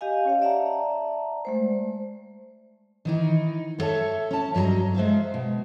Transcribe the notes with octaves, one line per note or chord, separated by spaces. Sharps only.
G4 D#5 F5 G#5
C#4 C#5 F5
D5 E5 F#5 A5 A#5
G#3 A3 C5
D#3 E3 D#4
B3 A4 C#5 E5 A5
C#4 A5
G2 F#3 A#4 D#5 A#5
G#3 C5 E5 F5
B2